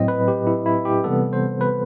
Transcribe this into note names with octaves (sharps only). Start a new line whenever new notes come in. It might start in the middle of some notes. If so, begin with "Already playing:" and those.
Already playing: A2 F#3 C4 D#5
B4
G4
E4
E4
G4
C3 E3 G3 B3 A4
C5
B4